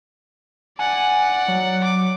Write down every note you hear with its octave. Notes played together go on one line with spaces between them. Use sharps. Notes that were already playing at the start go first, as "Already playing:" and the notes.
D5 F#5 G#5
F#3
D6